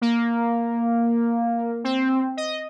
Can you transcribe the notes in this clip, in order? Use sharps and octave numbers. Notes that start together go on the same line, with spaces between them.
A#3
C4
D#5